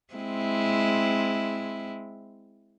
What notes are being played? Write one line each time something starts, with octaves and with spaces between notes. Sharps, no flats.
G#3 C4 E4